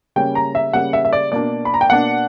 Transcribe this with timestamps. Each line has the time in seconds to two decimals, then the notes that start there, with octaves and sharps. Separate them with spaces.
0.16 C#3 G3 A#3 C#4 G5
0.35 A#5
0.55 E5
0.73 C#3 G3 A#3 C#4 F#5
0.93 E5
1.05 E5
1.13 D5
1.32 B2 A#3 D4 D5
1.65 B5
1.74 A#5
1.81 G5
1.89 B2 A#3 D4 F#5